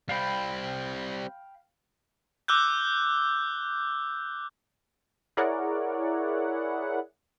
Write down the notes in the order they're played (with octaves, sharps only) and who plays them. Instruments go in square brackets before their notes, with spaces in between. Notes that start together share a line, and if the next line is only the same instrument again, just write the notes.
[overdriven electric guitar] G3 C4 [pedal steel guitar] F5 G5 B5
[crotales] D6 E6 F#6 G6
[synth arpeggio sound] E4 G#4 A#4 C#5 D5 F#5